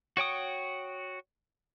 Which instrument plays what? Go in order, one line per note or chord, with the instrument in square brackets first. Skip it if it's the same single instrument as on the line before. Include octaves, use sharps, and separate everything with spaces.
[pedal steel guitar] F#4 C#5 G5 D#6